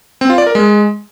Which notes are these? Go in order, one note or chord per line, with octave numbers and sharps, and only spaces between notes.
C4
F4
D5
A#4
G#3